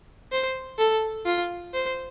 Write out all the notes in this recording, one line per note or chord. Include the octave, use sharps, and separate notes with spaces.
C5
A4
F4
C5